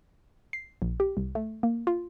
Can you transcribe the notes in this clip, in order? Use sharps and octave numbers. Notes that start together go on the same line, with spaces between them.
C7
A#1
G4
C2
A3
A#3
F4